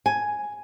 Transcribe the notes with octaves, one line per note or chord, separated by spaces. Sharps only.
G#5